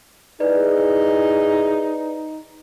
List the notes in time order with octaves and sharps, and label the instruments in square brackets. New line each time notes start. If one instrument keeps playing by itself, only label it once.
[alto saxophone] D#4 [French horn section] E4 G#4 [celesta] B4 D5